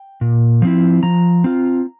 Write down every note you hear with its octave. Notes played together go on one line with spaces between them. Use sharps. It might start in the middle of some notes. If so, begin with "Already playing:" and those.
Already playing: G5
A#2
F3 C4 E4
F3 A#5
C4 F4